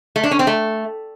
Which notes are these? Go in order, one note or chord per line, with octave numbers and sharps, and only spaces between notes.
A3
D4
C#4
C4
A3